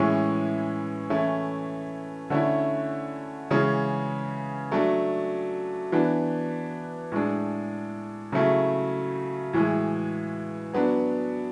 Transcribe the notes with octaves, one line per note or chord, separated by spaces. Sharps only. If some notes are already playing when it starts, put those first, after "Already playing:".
Already playing: A2 E3 G#3 C#4 E4
E3 A3 C#4 E4
D3 A3 C#4 E4
C#3 E3 G#3 C#4
F#3 A3 D4
E3 B3 D4
A2 G#3 D4
C#3 F#3 A3 E4
A2 E3 G#3
F#3 B3 D4